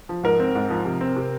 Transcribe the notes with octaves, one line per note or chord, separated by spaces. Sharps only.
F3
G#2 A#4
C4
G#2
F3
C3
C4
C3